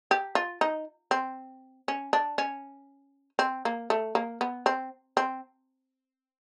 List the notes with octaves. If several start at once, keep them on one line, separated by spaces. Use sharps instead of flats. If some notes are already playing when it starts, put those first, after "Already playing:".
G4
F4
D#4
C4
C#4
D4
C#4
C4
A#3
A3
A#3
B3
C4
C4